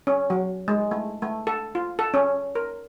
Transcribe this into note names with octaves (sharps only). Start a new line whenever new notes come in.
C#4
F#3
G#3
A3
A3
A4
F4
A4
C#4
A#4